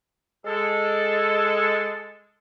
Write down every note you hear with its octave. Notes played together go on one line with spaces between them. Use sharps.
G#3 A4